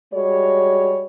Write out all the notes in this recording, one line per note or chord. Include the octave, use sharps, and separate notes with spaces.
G3 G#3 F#4 C#5